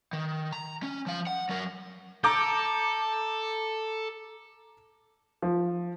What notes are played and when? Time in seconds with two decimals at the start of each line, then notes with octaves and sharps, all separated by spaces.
0.13 D#3
0.53 A#5
0.83 C#4
1.06 F3 F5
1.27 F#5
1.49 F#3 A#4
2.24 A4 A#5 D6 G6
5.42 F3